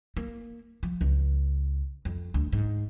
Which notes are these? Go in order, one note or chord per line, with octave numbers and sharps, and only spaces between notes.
A#3
F3
C#2
F2
D2
G#2